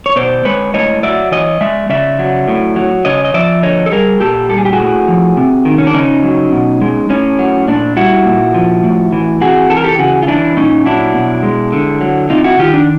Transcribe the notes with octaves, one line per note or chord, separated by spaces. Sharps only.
C#5
B2 C5 D5
G#3 B4 C#5
A2 C#5 D#5
F#3 D5 E5
E3 C#5 D#5
G#3 D5 E5
C#3 D5 E5
F#3
A2
F#3
C#3 C#5 D#5
D#5
F3 D5 E5
D3 C#5 D#5
A4
G3 G#4 A#4
A#2 G4 A4
G3 A4
G#4
G4
F#4 G#4
A2
F3
C3
D#3
C#4
D4
C#3 C#4 D#4
F#3
B2
G#3
A2 C#4
F#3
A#2 D4
G3 E4 F#4
A#2
F3
A2
E3
C3 F#4 G#4
E3 A4
A#4
G4 A4
C#3 F#4 G#4
F4
E3 D4 E4
A#2 C#4 D#4
F#3 D4 E4
B2
G#3
D3
F#3
C3 D#4 F4
E4 F#4
D#3 F4 G4
D4